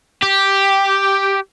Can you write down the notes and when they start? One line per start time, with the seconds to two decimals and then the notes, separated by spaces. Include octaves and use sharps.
0.23 G4